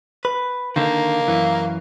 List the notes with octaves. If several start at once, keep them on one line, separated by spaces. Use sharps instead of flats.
B4
D3 D#3 A#3
F#2 E3